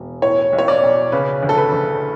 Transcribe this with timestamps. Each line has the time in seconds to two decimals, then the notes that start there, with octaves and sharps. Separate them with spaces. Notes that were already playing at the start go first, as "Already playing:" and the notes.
Already playing: E1
0.22 A2 C#5
0.53 B1
0.58 C#5
0.68 D5
0.83 B1
1.12 C#3 B4
1.43 D2
1.49 A4
1.58 B4
1.72 D2